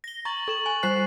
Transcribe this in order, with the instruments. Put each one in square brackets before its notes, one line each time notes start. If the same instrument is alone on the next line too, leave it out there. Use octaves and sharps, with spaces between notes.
[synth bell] A#6 G7
[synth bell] A#5 [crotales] C#6 A6 F#7
[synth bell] A4 [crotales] C#6 E7 F#7
[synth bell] G#5
[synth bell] G3 C5 F#6 [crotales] C7